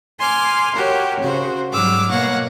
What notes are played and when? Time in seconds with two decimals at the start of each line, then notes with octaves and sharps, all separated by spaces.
0.19 G#5 C6 D6 F6
0.75 F#4 G4 A#4 C#5
1.20 C#3 F#4 C5
1.71 G#2 F#3 G3 D6 E6 F6
2.11 B2 A#3 C#5 F#5 C#6 A#6